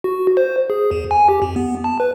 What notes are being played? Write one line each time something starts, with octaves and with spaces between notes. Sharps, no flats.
F#4
C5
G#4
E2
G#5
G4
F2
B3
A5
B4